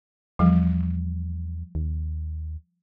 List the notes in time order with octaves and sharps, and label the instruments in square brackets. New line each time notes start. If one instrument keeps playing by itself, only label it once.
[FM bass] E2 [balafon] F3 G3
[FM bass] D#2